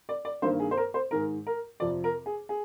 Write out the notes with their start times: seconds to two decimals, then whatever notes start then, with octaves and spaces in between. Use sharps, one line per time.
0.09 D5
0.25 D5
0.42 G2 D#3 A#3 C5
0.60 G#4
0.71 C5
0.77 A#4
0.94 C5
1.11 G#2 D#3 G#3 A#4
1.47 A#4
1.80 F2 C3 F3 D5
2.04 A#4
2.26 G#4
2.49 G#4